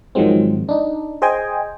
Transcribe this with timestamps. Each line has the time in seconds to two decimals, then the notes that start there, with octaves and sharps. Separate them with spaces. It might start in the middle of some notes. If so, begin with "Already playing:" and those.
0.15 G#2 D#3 F3 F#3 G#3 C4
0.69 D4 D#4
1.22 G#4 C5 D#5 G5 G#5